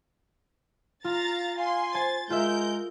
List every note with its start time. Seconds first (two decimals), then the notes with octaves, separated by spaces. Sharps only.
1.04 F4 F5 A#5 A6
1.58 F5 G#5 C6
1.95 C5 G#5 A6
2.30 G#3 F4 A#4 E5 G6